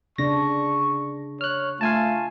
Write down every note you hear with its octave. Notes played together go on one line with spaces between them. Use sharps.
C#3 D4 C#6 A#6
C#5 F6 F#6
A3 F4 F5 G#5 A5